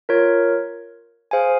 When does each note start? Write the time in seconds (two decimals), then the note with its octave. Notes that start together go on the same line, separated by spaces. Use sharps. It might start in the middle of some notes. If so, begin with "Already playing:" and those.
0.09 F4 A#4 C#5
1.31 G#4 C5 F5 G#5